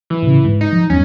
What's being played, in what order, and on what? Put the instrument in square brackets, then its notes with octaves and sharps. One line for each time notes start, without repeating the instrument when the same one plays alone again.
[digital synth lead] E3
[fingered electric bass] A2 C#3
G#2
[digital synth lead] D#4
[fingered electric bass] F3
[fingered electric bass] E2 G2 [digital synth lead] C#4